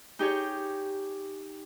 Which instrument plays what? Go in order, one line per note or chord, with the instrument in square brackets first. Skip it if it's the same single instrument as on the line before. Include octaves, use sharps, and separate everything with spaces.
[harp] D#4 G4 G#4 C#5